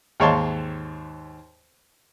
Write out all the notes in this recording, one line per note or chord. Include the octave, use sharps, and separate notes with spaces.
D#2 G#2 C#5 F5 A5 C6